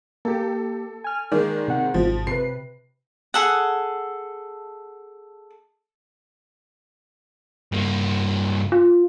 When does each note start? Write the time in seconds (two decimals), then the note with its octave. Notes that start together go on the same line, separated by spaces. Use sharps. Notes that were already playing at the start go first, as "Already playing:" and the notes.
0.25 A#3 G4 A4
1.04 G#5 F6
1.32 D#3 G#3 A#3 D5
1.68 C3 F#5
1.94 G#1 C3 F3
2.27 C3 B4 C7
3.34 G#4 A4 F#5
7.72 G2 A#3
8.72 F4